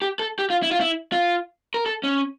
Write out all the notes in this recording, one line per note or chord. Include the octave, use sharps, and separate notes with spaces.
G4
A4
G4
F4
E4
F4
E4
F4
A#4
A4
C#4